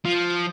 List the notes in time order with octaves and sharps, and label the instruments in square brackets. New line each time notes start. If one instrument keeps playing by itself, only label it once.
[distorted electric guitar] F3